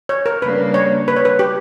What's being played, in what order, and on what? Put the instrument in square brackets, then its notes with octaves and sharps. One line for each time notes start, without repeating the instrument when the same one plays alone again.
[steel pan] C#5
A#4
[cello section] C#3 G3 A#3 D4 [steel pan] B4
[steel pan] C#5
B4
C#5
B4
G4